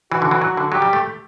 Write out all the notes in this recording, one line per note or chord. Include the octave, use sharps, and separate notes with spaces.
E3 F#4
D3
E3
F#3
D3
F#3 G4
G3
A3